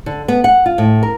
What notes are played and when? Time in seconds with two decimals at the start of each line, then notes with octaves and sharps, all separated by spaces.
0.06 D3
0.28 B3
0.44 F#5
0.66 F4
0.78 A2
1.03 A#4